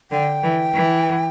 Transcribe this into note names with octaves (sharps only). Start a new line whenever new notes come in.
D3 G5
E3
E3